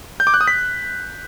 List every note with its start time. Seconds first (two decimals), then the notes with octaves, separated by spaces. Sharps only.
0.20 G6
0.27 D6
0.34 F#6
0.41 D#6
0.48 B6